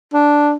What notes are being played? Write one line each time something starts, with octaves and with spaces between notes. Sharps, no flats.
D4